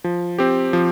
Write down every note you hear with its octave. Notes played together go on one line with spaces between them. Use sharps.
F3
C4 G4
F3